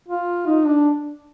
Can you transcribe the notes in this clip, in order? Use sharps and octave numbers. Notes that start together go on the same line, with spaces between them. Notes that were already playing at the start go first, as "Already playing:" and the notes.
F4
D#4
D4